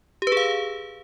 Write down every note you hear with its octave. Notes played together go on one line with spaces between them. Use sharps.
G4
B4
G#4
F5